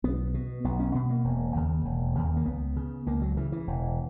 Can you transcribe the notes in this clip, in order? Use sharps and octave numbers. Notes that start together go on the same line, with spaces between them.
B1 B3
B2
B1 B3
C#4
B2 B3
A#3
E1
D#2 C#3
E1
D#2 C#3
A#3
C#2 B3
C#3
C#2 A#3
F#3
C#3 E3
E3
E1